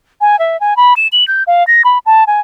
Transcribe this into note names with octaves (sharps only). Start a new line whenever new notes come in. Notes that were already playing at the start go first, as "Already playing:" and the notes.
G#5
E5
G#5
B5
E7
F#7
G6
F5
A#6
B5
A5
G#5